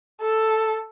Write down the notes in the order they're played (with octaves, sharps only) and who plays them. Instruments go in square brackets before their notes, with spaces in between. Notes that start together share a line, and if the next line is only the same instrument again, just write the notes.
[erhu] A4